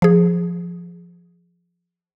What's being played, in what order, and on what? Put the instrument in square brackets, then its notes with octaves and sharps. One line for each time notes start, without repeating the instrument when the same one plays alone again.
[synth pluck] F3 G#4